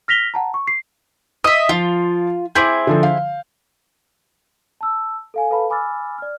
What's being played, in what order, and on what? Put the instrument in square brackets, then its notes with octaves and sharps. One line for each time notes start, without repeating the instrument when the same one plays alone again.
[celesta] F6 A#6 B6 F7 G7
F#5 A5 A#5
C#6
C7
[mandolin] D#5 E5 [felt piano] D#6
[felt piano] F3 [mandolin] F4
[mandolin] C4 E4 G#4 [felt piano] D6 G6
[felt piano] D3 F3 A4
F5
[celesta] A5 E6
A4 F5 G#5
A4 B4 F5 A5 B5
G#5 B5 D6 E6 F6 A6
D5 F6